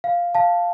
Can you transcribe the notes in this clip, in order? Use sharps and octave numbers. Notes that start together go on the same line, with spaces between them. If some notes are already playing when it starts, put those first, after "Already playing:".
F5
F5 A5